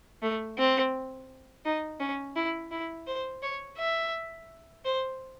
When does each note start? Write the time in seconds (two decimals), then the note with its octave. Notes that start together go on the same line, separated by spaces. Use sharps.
0.22 A3
0.58 C4
1.65 D#4
2.00 C#4
2.36 E4
2.71 E4
3.07 C5
3.43 C#5
3.78 E5
4.85 C5